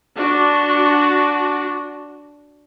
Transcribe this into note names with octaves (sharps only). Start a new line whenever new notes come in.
D4 F#4